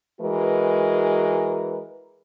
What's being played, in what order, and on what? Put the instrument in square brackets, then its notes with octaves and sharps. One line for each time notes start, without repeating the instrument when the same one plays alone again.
[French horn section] E3 G#3 F#4 A#4 B4